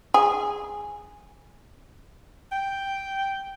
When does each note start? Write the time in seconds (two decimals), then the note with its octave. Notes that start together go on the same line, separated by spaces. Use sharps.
0.14 G#4
2.52 G5